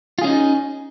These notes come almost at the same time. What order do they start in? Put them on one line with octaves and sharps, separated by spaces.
F4 G#4 C#4 D#4